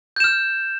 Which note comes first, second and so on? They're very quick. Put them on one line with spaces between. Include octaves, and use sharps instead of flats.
G6 E7 F6